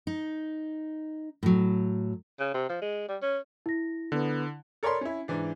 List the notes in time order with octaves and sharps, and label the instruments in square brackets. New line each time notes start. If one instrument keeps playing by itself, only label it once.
[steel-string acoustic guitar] D#4
A2 F#3
[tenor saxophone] C#3
C3
F3
G#3
G3
C#4
[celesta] E4 A#6
[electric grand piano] D3 [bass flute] B3
[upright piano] A4 A#4 C#5 D5 B5 C6
C#4 E4
G#2 E3 D4